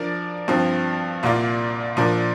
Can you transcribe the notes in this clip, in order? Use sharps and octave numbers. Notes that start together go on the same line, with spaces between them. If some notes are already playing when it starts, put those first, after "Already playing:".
Already playing: F3 D4 A#4 D5
G2 F3 C4
C2 A#2 A#3 F4 D5
A#2 F3 D4 A#4 D5